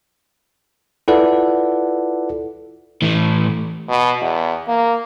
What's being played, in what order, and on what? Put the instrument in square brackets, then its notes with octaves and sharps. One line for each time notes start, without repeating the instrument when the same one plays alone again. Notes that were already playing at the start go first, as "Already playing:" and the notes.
[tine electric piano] E4 F4 A4 B4 D5 F#5
[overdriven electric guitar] A2 E3
[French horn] B2
E2
A#3